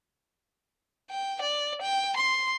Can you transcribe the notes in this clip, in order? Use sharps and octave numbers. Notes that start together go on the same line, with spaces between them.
G5
D5
G5
C6